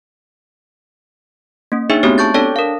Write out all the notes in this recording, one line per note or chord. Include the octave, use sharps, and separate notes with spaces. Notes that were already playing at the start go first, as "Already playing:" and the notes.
A#3 C#4
D4 D#4 G#4 C#5 E5
A3 B3 C4 F#4 G4 C#5
A5 C#6 G6 A6
D4 A4 C#5 D5 A5
A#4 F5